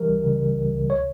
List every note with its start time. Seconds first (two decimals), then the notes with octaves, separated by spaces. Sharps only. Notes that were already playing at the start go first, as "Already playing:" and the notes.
Already playing: E3 G3 A#4
0.09 C#2
0.24 C#3
0.40 C#3
0.57 C#2
0.74 C#2
0.90 C#5